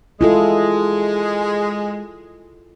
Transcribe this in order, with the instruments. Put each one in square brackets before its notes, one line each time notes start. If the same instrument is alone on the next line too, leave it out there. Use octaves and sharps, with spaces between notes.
[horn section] G#3 [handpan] E4 F4 A4